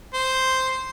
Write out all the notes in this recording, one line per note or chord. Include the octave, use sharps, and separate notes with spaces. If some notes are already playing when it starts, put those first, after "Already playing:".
C5